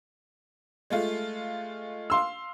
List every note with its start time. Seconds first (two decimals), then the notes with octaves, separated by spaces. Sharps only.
0.90 G#3 A3 F4
2.10 F5 C6 E6